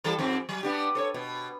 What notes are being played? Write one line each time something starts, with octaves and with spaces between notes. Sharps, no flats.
E3 G3 A4
F2 G#2 C4
F#3
B3 D4 G4
A4 C5 C#5
B2